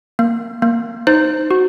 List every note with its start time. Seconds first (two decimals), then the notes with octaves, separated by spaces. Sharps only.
0.19 A#3
0.62 A#3
1.07 D#4 C5
1.51 F#4